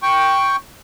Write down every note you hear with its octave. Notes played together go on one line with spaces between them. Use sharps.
G5 C#6